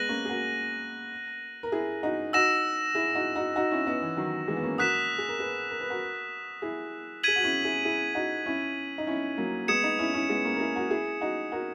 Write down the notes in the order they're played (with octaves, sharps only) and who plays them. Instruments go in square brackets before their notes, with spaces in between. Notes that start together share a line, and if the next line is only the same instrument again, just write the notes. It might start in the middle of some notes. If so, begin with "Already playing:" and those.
Already playing: [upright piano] G#3 B3 [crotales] F#6 A#6 D#7 F#7
[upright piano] A#3 C#4
G#4
F#4 A#4
A#4
E4 G#4
D#4 F#4
[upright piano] D#4 F#4 [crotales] E6 A#6 E7
[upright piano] E4 G#4
D#4 F#4
D#4 F#4
D#4 F#4
C#4 E4
B3 D#4
E3
D#3 F#3
E3 G#3
B3
A#3 C#4
[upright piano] F#4 A#4 [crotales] D#6 F#6 B6 E7
[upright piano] G#4
A#4
G#4 B4
A#4
B4
F#4 A#4
E4 G#4
[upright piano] G#4 [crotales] G#6 B6 D#7 F#7
[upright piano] F#4
C#4 E4
E4 G#4
E4 G#4
D#4 F#4
C#4 E4
D#4
C#4 E4
F#3 A#3
[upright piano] G#3 B3 [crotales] D#6 G#6 C#7 E7
[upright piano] B3 D#4
C#4 E4
C#4 E4
G#3 B3
A#3 C#4
A#4
E4 G#4
F#4 A#4
E4 G#4
D#4 F#4
F#4 A#4